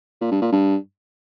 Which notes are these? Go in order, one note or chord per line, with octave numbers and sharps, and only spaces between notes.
A#2
G2
A#2
G2